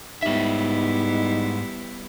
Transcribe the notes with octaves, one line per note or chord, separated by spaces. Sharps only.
G#2 G3 B3 D#4 E4 E5